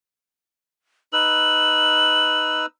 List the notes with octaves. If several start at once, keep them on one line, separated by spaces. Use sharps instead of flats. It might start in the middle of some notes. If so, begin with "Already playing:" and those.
D#4 B4 E6 F#7